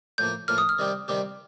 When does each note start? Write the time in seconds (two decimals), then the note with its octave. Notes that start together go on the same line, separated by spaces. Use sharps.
0.18 A2 F3 A#3 G6
0.48 A2 F3 A#3 F6
0.58 D#6
0.69 F6
0.79 C3 D#3 G3 C4 G4
1.08 C3 D#3 G3 C4 G4